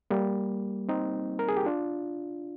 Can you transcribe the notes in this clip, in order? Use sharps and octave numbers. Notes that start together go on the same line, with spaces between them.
G3 A#3
C4 D#4
A#4
G#4
G4
D4 F4